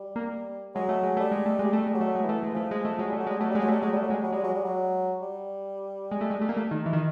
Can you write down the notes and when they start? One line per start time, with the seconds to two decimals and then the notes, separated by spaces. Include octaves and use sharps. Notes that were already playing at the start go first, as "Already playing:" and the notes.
Already playing: G3
0.16 A#3
0.75 F#3 G#3
0.89 A3
1.03 G#3
1.17 G3 A3
1.31 G#3
1.46 A3
1.59 G#3
1.64 G3
1.73 A3
1.87 G#3
1.94 F#3
2.01 A3
2.15 G#3
2.24 E3 A3
2.43 G#3
2.49 E3
2.54 F3 A3
2.71 G#3
2.85 A3
2.99 F#3 G#3
3.09 G3 A3
3.19 F#3
3.27 G3 G#3
3.40 F#3 A3
3.50 G3 G#3
3.61 F#3
3.68 G3 A3
3.81 F#3 G#3
3.92 G3 A3
4.02 F#3
4.10 G#3
4.13 G3
4.23 F#3
4.32 G3 G#3
4.44 F#3
4.54 G3
4.64 F#3
5.22 G3
6.11 G#3
6.21 A3
6.30 G#3
6.41 A3
6.49 A#3
6.57 A3
6.71 D#3
6.86 E3
6.93 D#3